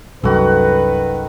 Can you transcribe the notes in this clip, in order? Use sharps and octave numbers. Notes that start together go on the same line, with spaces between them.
C2 F#2 D#3 F#4 A4 B4